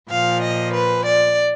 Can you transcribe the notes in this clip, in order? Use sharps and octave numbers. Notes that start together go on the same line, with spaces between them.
A#2 F3 F5
D#5
B4
D5